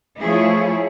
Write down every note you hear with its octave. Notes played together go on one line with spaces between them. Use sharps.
F3 A3 E4 G#4 C#5